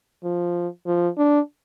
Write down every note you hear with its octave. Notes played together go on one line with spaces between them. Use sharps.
F3
F3
D4